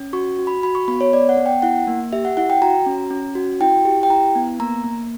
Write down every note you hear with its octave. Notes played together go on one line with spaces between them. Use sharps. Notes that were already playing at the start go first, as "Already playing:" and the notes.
Already playing: C#4
F#4 C#6
F#4
B5
F#4 B5
C#6
B3 B5
C#5
B3 D5
F#5
B3
G5
E4 F#5
A#3
G4 E5
F#5
E4 F#5
G5
F#4 A#5
C#4
C#4
F#4
E4 G5
G4
G5
E4 A#5
B3
A#3 A#5
A#3